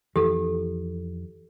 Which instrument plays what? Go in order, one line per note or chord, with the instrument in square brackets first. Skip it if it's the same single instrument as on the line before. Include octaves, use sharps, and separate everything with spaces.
[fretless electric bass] F2 E3 [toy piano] G4 A4